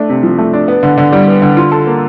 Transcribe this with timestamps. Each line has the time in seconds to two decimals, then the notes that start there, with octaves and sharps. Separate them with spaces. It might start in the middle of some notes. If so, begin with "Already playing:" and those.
Already playing: A3 D4
0.09 C3
0.23 F3
0.38 A3
0.53 D4
0.68 B3
0.83 D3
0.98 D3
1.13 G3
1.27 B3
1.42 D3
1.57 F4
1.72 A4
1.87 A#3